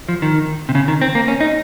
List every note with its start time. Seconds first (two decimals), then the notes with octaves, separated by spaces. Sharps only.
0.09 F3
0.22 D#3
0.69 C3
0.75 C#3
0.88 D#3
1.01 C4
1.15 A#3
1.28 C#4
1.41 D#4